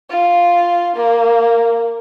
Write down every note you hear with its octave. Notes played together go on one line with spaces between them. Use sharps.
F4
A#3